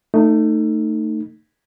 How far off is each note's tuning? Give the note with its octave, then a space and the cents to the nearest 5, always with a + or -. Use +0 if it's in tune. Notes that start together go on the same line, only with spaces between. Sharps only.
A3 +25 D#4 -10